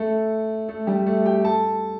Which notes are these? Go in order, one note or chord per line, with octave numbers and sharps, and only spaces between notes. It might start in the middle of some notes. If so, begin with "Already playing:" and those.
Already playing: A3 A4
A3 A4
G3 G4
A3 A4
G4 G5
A4 A5